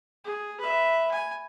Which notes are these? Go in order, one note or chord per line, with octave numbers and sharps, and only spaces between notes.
G#4
B4 E5
G#5